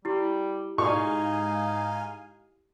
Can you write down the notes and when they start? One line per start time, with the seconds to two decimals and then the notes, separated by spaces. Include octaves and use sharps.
0.05 G3 E4 G4
0.78 G#2 D#4 F5 G#5 C#6